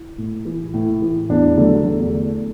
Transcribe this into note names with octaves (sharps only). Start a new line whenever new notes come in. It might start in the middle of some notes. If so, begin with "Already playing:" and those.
Already playing: E4
A2
E3
A2
E3
E2 D4
D3 F#3 A3
E2